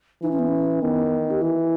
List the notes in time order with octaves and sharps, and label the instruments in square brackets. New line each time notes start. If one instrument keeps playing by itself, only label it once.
[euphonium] E3 [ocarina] D#4
[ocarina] C#4
B3
C#4
[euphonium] D#3 [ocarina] B3
[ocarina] G4
[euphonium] E3 [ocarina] E4